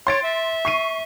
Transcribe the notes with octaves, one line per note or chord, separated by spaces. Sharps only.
C#5 C6 A6 D7
E5
C#6 C7 D#7